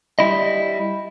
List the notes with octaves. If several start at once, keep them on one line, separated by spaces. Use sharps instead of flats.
G3 E4 D#5